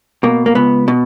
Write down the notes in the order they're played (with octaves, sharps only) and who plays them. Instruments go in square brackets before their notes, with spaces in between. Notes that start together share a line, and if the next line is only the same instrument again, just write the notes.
[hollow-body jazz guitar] B2 A#3
A#3
C#2 B3
B2